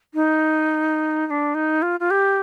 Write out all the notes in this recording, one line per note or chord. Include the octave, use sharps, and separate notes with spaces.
D#4
D#4
D4
D#4
F4
F4
G4